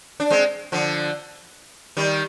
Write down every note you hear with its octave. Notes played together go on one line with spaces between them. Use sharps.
D4
G#3 C4
D3 F3
D#3 G3